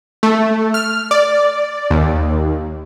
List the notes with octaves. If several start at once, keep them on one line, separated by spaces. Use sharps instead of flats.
A3
F6
D5
D#2